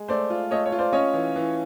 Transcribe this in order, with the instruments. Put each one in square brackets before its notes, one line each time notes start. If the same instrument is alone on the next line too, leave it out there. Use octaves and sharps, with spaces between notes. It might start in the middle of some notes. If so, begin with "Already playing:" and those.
Already playing: [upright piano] G#3
[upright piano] A3 [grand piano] C5 D5
[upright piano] F4
[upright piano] A3 [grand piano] C#5 D#5
[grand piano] C#5
[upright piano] F4
[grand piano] C5 D5
[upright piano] C#4 [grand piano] C#5 D#5
[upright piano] E3
E3